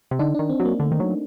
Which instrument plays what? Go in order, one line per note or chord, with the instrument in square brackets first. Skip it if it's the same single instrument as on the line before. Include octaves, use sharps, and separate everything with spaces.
[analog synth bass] C3
[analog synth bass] D3 [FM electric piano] D#4
[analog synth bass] D#3 [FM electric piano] D4
[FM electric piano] C4
[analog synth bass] F#3
[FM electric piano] A#3
[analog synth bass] D3 [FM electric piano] A3
[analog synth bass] D#3
F#3